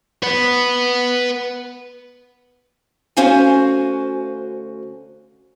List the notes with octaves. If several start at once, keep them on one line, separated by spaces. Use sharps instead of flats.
B4 F#5
D2 C#4 F#4 C5 F5 G#5